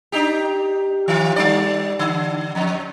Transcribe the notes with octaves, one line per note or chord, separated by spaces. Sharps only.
D4 D#4 G4
D#3 F4
G3 D#4 D5
D3
F2